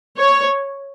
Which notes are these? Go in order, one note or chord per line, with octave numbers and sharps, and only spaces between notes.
C#5